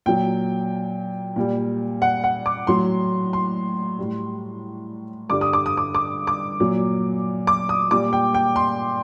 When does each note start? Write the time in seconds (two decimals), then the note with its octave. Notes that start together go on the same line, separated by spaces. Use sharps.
0.06 A#2 F#3 G5
1.36 A#2 G3
2.02 F#5
2.24 F#5
2.46 D6
2.67 A2 F#3 C6
3.33 C6
3.98 A2 G3
5.29 G2 D3 G3 D6
5.41 D#6
5.53 D6
5.66 D#6
5.77 D6
5.95 D6
6.27 D6
6.60 A#2 F#3
7.47 D6
7.69 D#6
7.91 A#2 G3 D6
8.13 G5
8.34 G5
8.56 C6